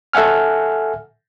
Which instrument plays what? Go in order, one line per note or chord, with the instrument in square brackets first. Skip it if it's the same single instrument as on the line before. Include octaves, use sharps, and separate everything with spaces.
[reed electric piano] A4 E5 F#5 G#5 F6